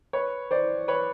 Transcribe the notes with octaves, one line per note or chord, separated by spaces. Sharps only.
B4 C#5
C5 D5
B4 C#5